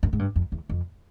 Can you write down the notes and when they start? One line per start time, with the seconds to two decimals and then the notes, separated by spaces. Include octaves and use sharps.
0.03 F#2
0.13 G#2
0.19 G2
0.36 F2
0.52 E2
0.70 F2